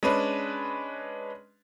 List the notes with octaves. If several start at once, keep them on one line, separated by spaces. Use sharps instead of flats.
G#3 C#4 D4 B4